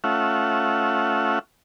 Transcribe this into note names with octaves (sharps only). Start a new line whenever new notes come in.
A3 C#4 F4 E5 F#5